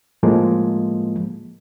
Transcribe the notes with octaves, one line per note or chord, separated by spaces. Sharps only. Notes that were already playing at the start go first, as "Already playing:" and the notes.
A2 F3 G#3 A#3